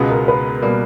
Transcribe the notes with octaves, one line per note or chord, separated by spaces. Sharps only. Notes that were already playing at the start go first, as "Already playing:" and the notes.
Already playing: C#2 B2 G#3 B3
A#4
B4
B2 G3 A#3